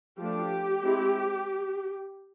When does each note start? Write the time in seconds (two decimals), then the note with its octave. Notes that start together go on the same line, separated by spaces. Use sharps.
0.19 F3 A3 D4 G4
0.82 G#3 C4 E4